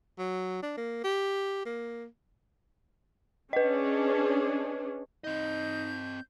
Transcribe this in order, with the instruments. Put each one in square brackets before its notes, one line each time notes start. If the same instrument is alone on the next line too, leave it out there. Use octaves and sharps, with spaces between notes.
[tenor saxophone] F#3
D4
A#3
G4
A#3
[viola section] C#4 D4 G#4 [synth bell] B4 D#5
[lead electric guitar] C4 D#5 [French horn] D#4 [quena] G6